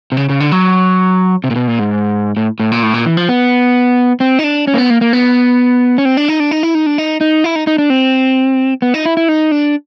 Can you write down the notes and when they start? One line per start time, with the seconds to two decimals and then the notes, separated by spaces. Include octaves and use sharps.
0.12 C3
0.17 C#3
0.29 C#3
0.40 D3
0.52 F#3
1.44 C3
1.50 A#2
1.56 B2
1.67 A#2
1.79 G#2
2.37 A2
2.60 A2
2.72 A#2
2.83 A2
2.94 A#2
3.05 E3
3.17 F3
3.29 B3
4.20 C4
4.39 D#4
4.44 D4
4.67 C#4
4.74 A#3
4.78 B3
4.90 A#3
5.01 A#3
5.13 B3
5.98 C#4
6.05 C4
6.17 D4
6.28 D#4
6.40 D4
6.51 D#4
6.63 E4
6.75 D#4
6.86 D4
6.98 D#4
7.21 D#4
7.44 E4
7.56 D#4
7.67 D#4
7.78 D4
7.90 C4
8.82 B3
8.94 D#4
9.05 E4
9.17 E4
9.28 D#4
9.51 D4